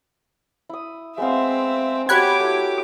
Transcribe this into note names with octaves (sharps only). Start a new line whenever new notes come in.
E4 D#6
G#3 B3 C4 E5 F5
F#4 G4 C#5 G5 B5 D6 F#6 G#6
A3 E4